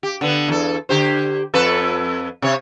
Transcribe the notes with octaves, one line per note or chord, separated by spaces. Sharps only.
G4
D3 B3
E2 A4
D3 G4 C5
F2 A4 B4
C3 C#5